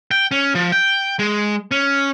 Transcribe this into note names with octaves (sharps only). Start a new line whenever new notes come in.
G5
C#4
F3
G5
G#3
C#4